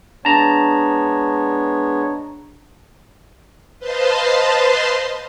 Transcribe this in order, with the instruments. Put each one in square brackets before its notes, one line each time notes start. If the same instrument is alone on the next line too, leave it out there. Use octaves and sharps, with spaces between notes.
[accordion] G#3 B3 C#5 [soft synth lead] D4 [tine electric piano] A5 A#5
[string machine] B4 C5 D#5 F5 A5 C6